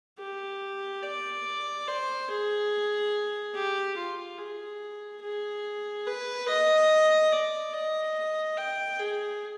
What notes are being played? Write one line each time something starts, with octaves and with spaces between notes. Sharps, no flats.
G4
D5
C5
G#4
G4
F4
G#4
G#4
B4
D#5
D5
D#5
G5
G#4